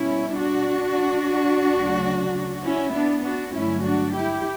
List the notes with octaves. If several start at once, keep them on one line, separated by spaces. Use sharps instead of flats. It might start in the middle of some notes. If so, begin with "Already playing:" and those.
Already playing: B2 G3 C#4 E4
D4 F#4
D2 C#3 F#3
C#4 E4
B3 D4
D4 F#4
G2 D3 F#3 A3 C#4 E4
D4 F#4
E4 G4